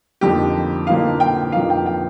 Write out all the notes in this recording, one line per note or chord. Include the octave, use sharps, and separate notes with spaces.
F2 D3 F3 A#3 D#4 G4
F2 D3 F3 A#3 D#4 F5
G5
F2 D3 F3 A#3 D#4 F5
G5
G5